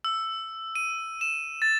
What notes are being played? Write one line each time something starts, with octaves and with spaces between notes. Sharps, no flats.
E6
D#7
E7
A6